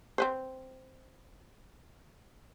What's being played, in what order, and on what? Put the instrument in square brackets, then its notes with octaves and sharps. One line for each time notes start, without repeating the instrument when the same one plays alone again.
[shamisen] C4 B4 C5